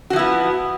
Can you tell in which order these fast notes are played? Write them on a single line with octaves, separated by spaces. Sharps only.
F#4 F3 E4 B3